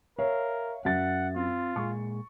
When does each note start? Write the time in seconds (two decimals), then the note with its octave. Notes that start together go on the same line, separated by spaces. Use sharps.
0.19 A#4 C#5 E5 F5
0.85 F#2 E5 F#5 A6
1.36 C4 F4
1.76 A#2 G#3 G#4 C#6